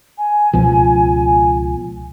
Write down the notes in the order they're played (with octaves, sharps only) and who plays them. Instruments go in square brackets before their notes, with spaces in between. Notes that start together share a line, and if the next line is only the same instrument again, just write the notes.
[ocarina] G#5
[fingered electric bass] C#2 B2 F3